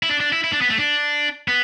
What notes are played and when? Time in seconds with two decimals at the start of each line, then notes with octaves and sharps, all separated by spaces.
0.03 E4
0.09 D4
0.20 D4
0.33 E4
0.44 E4
0.53 D4
0.61 B3
0.70 A3
0.78 D4
1.48 B3